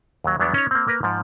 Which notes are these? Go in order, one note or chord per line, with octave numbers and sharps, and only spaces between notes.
D#2 F#3
E2 F#3 G3 B3 D4
C#4 D#4 C#5
A#3 C4
A#3 A#4 B4
G#2 F3